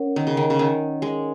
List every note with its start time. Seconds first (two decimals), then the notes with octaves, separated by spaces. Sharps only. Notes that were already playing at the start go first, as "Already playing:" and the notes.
Already playing: C#4 A#4 C#5 F#5
0.16 D#3
0.27 C#3
0.37 D#3
0.50 C#3
0.59 D#3
1.02 G#3